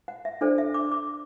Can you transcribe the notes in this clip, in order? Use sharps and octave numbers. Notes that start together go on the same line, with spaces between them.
F#5
E5
D4 A4 C5 D5
E5
D6
D6